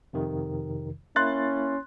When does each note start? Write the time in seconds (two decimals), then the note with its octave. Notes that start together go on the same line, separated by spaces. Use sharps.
0.13 F2 C3 D#3
1.16 A#3 C#4 E4 C6 F#6 A6